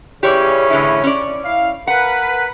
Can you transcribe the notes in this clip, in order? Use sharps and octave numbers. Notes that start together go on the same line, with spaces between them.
C#3 E3 C#4 G4 C#5 D5
A2 D3 E4
C#4 D5
E4 F5
A#4 B4 F#5